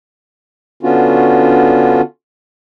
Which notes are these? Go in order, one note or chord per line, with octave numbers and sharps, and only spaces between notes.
D3 B3 C#4 D4 F4 F#4